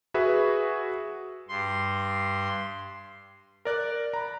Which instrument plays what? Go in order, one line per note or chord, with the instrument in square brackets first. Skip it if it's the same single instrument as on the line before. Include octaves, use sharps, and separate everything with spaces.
[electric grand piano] F#4 G#4 B4 E5
[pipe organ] G2 C6
[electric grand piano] A#4 D5 F#6
A#5 B5